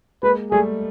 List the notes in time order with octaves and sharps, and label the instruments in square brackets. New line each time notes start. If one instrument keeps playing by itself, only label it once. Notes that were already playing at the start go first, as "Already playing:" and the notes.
[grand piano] G#3 A#3 [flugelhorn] B4
[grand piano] G3 A3 [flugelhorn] G#4